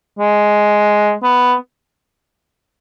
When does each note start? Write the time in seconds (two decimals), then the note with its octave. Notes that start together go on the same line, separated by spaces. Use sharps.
0.19 G#3
1.23 B3